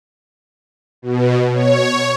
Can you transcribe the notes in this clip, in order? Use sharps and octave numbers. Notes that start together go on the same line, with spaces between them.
B2
C#5